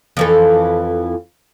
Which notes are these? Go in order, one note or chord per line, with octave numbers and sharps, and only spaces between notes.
F2 E3 A4